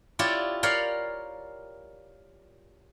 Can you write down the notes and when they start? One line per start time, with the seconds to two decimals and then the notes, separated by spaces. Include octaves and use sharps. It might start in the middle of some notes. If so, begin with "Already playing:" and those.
0.19 E4 F4 G4 C#5 D5
0.63 A#4 C#5 D5 F5 G5 B5